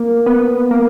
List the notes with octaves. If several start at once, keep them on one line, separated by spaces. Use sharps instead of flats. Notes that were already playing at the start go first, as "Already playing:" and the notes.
Already playing: A#3
B3
A#3